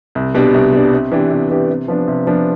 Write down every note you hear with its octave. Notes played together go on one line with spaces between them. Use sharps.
C2
B2 G3 D4
C2
B2 G3 D4
C3
E3 B3 D4 G4
C3
E3 B3 D4 G4
C3
F3 B3 D4
C3
F3 B3 D4